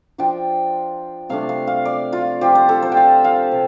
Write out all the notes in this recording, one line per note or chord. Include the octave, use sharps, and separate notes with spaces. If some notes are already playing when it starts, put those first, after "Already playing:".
F3 D4 F4 G5
C3 A3 D4 F5
F5
F5
D5
F4
F3 C4 F4 G4
C5
A4
C5
G5
F5
F5
C3